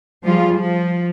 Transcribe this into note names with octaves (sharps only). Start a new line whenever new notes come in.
F3 G3 F4 G#4
F3